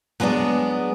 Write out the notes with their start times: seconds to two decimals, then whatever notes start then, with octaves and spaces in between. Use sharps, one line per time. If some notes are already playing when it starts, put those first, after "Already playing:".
0.20 F#3 G#3 B3 C4 D4